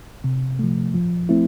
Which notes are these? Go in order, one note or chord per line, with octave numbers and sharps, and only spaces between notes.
C3
F3 A3
F3
A3 C4 E4